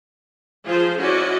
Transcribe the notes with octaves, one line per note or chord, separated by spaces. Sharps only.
F3 F4 G#4 A4 C5
C#4 E4 F#4 D5 D#5